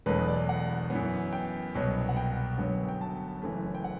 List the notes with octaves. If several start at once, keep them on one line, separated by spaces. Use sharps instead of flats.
E1 E2 B2 F#3 A3 B4
D5
F#5
F#2 E3 B3
G5
C2 B2 F#3 B3
F#5
G5
G1 F#2 F#3 B3
G5
A5
F#1 F#2 E3 A3
G5
F#5